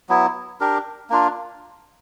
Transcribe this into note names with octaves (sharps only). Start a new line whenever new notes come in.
F#3 B3 E4
D4 G4 A#4
A#3 D4 F4